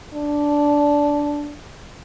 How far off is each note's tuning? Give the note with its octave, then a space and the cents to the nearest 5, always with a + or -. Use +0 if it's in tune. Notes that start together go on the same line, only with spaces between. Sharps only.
D4 -10